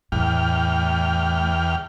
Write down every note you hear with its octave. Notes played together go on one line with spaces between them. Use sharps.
E2 A2 G5 F6